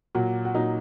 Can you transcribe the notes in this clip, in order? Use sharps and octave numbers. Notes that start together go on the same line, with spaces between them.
A#2 F#3 F#4
F#4
A#2 F#3 D#4